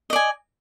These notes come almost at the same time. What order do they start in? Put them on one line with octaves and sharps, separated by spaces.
D#5 D5 G#5